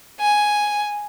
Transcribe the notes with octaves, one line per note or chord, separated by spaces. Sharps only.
G#5